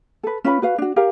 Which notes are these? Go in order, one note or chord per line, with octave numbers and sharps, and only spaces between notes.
A4 B4
C#4 F4 B4 B5
F#4 B4 F5
D4 F#4
G4 A#4 F5